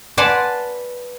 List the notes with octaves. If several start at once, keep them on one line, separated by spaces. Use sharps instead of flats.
B4 D5 F#5 G#5 A5 C6